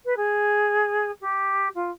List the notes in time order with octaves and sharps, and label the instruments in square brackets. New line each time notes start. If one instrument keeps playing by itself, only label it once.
[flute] B4
G#4
G4
F4